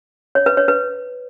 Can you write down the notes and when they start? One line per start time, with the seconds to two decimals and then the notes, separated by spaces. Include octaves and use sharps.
0.35 C#5
0.46 B4
0.57 C#5
0.68 B4